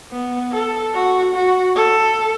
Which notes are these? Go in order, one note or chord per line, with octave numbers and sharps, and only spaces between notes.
B3
A4
F#4
F#4
A4